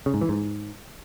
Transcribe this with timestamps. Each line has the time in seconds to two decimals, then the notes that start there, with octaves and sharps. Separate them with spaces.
0.06 C#3
0.14 G#2
0.21 E3
0.29 G#2